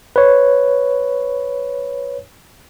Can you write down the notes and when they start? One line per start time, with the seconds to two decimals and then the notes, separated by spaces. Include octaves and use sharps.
0.16 B4 C#5